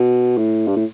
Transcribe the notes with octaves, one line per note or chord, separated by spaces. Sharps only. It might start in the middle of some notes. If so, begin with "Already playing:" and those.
Already playing: B2
A2
G2
A2